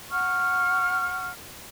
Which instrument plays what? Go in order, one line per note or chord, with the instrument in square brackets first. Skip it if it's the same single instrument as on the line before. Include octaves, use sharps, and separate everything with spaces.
[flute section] F#5 C#6 F6